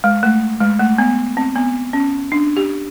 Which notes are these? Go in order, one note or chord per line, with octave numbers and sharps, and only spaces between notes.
G#3
A3
G#3
A3
B3
C4
B3
C#4
D4
G4